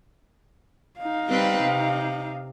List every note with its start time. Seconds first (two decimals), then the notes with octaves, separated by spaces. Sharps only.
1.00 D#4 F5
1.28 G3 C4 B4
1.64 C3